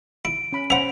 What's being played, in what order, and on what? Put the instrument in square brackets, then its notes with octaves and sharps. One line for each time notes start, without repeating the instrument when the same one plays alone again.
[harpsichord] E4 [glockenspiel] D7
[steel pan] C#4 B5
[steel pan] C#4 C5 B5 [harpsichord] E5 F#5 [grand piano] F7